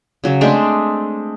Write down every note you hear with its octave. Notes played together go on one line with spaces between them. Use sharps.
C#3 F#3
G#3 A3 C4 D4